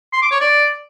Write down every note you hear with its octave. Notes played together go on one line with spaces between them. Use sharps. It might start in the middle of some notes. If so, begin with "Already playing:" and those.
C6
D6
C#5
D5